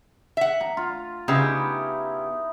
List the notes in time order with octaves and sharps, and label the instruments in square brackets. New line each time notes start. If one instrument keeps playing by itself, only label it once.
[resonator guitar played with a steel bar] E5 F#5
[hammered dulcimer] A#5
F4
[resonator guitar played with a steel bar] C#3 B3 G4 [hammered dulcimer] D#4 E4